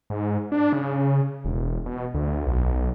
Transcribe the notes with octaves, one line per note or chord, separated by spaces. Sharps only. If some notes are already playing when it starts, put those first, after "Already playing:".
G#2
D4
C#3
E1
B2
D2
B1